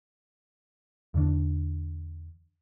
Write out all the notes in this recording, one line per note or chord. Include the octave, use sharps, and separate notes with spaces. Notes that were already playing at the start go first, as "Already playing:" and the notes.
E2 D3 A3 D4